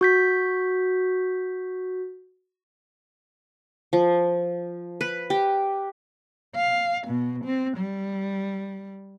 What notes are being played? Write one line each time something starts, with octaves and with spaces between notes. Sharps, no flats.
F#4 G6 B6
F3
B4
G4
F5
B2
C4
G3